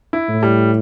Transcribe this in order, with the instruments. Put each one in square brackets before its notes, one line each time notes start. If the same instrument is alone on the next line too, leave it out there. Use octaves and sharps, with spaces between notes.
[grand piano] E4
[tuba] A2
[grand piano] G3